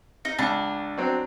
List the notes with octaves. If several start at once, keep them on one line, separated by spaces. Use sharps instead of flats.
D#4
C#2 D4
F#3 C4